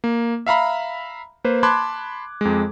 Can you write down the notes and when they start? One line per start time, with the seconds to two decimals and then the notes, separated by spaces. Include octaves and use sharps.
0.04 A#3
0.46 E5 F5 A#5 B5
1.44 A#3 B4 C5
1.63 A5 B5 C6 D6 F#6 G#6
2.41 F2 G#3